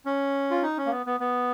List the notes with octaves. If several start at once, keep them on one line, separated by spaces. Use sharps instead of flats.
C#4
F4
D#4
C#4
A#3
B3
B3
B3